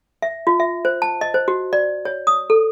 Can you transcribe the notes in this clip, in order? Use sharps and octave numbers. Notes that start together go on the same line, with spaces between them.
E5
F4
E5
C5
A5
D#5
C5
F#4
D5
C#5
D#6
A4